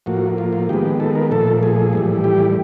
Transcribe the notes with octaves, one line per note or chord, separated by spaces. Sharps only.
A2 F3 A#3 F#4
F4
F4
D#3 G#3 B3 G4
A4
A#4
A#2 F3 A3 A4
G#4
A2 E3 G3
G4